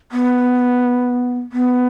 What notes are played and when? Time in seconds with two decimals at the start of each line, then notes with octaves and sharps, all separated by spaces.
0.12 B3
1.52 B3